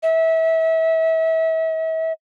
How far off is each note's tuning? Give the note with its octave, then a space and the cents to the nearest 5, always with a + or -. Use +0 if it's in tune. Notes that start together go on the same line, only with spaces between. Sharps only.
E5 -30